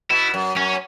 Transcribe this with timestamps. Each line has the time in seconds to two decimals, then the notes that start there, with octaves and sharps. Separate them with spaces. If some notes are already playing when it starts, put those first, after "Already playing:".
0.10 B2 E4
0.34 F#2
0.56 F#2 C#4